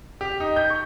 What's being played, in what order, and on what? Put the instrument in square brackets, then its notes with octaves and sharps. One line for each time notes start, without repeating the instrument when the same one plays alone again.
[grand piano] G4
D#4
G6
C#6